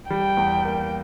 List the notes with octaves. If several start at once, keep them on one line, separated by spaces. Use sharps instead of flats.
G3 G5
E2
A#3